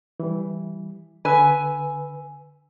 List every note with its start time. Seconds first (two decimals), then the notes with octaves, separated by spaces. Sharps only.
0.20 E3 G3
1.25 D3 B4 G#5 E6